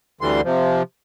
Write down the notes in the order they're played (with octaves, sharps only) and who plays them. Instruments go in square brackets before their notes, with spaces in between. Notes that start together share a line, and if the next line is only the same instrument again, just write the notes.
[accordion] D2 D3 E3 G3 C6
C3 F3